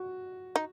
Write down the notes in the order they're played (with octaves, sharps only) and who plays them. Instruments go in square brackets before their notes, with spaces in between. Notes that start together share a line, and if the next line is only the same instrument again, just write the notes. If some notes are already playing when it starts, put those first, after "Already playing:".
Already playing: [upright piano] F#4
[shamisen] D#4